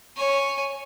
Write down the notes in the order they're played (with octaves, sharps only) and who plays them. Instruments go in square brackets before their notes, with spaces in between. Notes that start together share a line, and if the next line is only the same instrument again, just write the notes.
[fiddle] C#5 G#5